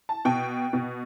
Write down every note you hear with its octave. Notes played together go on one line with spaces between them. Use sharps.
A5
B2 G5
B2